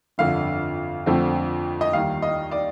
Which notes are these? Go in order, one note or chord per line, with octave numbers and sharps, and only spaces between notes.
G1 F2 D3 F5
F2 D3 A3 C4
D#5
D#2 D#3 G3 F5
D#5
D5